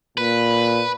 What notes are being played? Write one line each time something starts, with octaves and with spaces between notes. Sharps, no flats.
A#2 B4